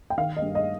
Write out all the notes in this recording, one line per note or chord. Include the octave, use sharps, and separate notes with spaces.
G5
D#3 F5
D#5
G2
D#5